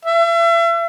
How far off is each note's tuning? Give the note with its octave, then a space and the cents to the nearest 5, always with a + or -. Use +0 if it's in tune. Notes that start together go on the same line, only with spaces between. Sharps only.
E5 +35